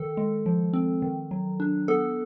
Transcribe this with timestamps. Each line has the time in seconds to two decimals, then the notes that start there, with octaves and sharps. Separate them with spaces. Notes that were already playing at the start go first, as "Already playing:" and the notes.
Already playing: D#3 A4
0.17 G#3
0.46 F3
0.73 C4
1.02 D#3
1.31 F#3
1.60 D4
1.88 B3 A4